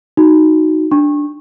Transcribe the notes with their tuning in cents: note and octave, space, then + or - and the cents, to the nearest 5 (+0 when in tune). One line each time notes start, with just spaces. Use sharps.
D#4 +0 F#4 +0
D4 +0 C#6 -25